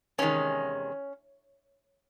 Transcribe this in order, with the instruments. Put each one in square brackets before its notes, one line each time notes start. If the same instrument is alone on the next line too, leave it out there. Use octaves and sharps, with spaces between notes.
[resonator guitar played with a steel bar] E2 C3 D#3 G#3 C#4